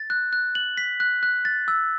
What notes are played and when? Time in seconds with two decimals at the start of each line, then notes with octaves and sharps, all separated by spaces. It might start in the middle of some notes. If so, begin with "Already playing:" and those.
Already playing: A6
0.10 F#6
0.33 F#6
0.55 F#7
0.77 B6
1.00 F#6
1.23 F#6
1.45 A6
1.68 E6